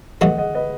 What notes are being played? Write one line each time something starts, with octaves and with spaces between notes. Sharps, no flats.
A1 G2 E3 A3 D#5 F#5
D#5 F#5
B4 D#5